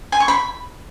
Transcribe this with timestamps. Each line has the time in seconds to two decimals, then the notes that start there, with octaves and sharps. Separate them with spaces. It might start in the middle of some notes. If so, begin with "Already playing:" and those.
0.12 G#5
0.20 C#6
0.28 B5